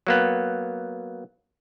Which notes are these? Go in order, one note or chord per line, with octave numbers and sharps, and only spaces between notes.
F#3 A#3 B3